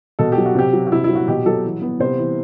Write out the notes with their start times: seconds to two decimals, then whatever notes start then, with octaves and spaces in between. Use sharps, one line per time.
0.19 B2 A4
0.32 G4
0.37 F#3
0.46 F#4
0.55 C3 G4
0.73 F#3
0.86 F#4
0.91 C3 E4
1.04 E4
1.09 F#3
1.15 F#4
1.28 B2 G4
1.46 F#3 A4
1.65 E3
1.82 B3
2.00 C3 C5
2.19 E3